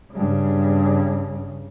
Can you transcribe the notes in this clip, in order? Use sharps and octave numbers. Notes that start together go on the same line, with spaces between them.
G2 C#3